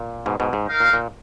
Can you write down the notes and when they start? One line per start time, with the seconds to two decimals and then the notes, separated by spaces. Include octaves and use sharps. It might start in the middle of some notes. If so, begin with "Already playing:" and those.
Already playing: A#2
0.26 G#2 B2
0.40 G#2 B2
0.53 G#2
0.67 D#4 A#4 F5
0.80 A#2
0.93 A#2